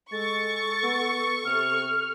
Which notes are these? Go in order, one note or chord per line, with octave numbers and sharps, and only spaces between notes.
G#3 A4 C#6 A6
B3
C3 F6